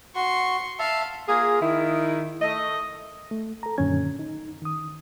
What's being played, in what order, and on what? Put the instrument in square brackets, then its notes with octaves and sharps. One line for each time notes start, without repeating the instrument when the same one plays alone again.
[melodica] F#4 [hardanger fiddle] C6 C#6
[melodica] E5 A5 [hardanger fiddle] F5
[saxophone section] A#3 F4 G#4
D#3 E4
A3 D#5
[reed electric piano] A3
A4 A#5
F#2 A#2 D3 D#3 C#4 G#6
D#4
D#3 D#6